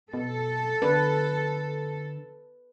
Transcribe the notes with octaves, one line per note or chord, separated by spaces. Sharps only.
B2 A4
D3 B4